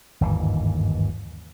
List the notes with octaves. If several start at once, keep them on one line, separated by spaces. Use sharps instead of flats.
G1 D#2 G#2 E3